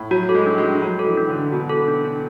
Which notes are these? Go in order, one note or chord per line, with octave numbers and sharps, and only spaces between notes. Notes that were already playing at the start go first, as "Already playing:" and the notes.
Already playing: A2
F#3 F#4
A4
G#3
D4
G#3
D4
F#3 F#4
A4
E3
D4
D3
D4
B2 F#4
A4
D4
D4